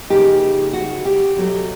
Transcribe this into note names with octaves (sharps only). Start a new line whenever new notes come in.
C#3 F3 A#3 D#4 G4
F#4
G4
B2 F#3 A3